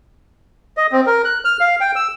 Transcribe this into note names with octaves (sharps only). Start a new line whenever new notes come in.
D#5
C4
A#4
F#6
F6
F5
G5
E6